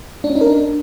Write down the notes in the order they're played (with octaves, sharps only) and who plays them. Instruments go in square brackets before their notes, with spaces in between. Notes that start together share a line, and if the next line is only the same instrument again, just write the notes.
[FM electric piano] D4
C#4
D#4
A#4
D4